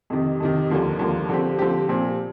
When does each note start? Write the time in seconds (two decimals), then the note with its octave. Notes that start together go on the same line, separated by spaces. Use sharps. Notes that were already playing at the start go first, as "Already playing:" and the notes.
0.10 F2 C3 D#3
0.40 F2 C3 D#3
0.70 D#2 D3 F3 A#3
0.99 D#2 D3 F3 A#3
1.29 D3 F3 C4 G4
1.59 D3 F3 C4 G4
1.88 A#2 F3 C4 G4